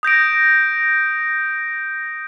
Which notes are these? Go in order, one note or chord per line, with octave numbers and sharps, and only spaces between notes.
D#6 G6 A#6 D7